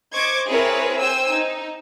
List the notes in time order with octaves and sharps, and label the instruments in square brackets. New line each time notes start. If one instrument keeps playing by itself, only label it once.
[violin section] C5 D#5 C#6 D6 G#6
C4 E4 G#4 A#4 B4 C#5
C5 G5 G#5 E6
D#4